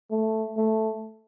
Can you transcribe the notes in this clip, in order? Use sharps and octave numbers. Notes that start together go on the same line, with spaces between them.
A3
A3